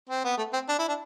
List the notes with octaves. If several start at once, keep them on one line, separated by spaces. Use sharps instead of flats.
C4
B3
A3
C4
D4
E4
D4